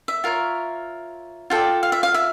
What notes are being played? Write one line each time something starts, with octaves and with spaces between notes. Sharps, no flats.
E5
F4 A#4 C#5
F4 A4 D5 G5
F5
E5
F5
E5